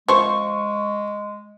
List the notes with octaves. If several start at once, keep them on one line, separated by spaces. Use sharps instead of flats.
F3 G#3 C5 C#6